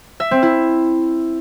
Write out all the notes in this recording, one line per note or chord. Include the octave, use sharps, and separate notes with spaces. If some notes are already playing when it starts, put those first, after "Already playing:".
E5
C4
E4